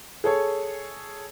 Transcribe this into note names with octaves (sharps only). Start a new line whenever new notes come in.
G#4 A4 C#5